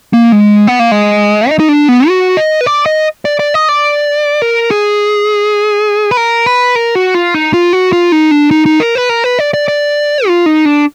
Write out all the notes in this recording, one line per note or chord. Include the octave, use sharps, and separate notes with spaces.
A#3
G#3
B3
A#3
G#3
D#4
D#4
D4
B3
F#4
D#5
B4
D5
D#5
D5
D5
D#5
D5
A#4
G#4
B4
A#4
B4
A#4
F#4
F4
D#4
F4
F#4
F4
D#4
D4
D#4
D#4
A#4
B4
A#4
B4
D5
D5
D5
F4
D#4
D4